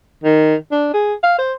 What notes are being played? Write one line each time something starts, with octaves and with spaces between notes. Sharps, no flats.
D#3
D4
G#4
F5
C5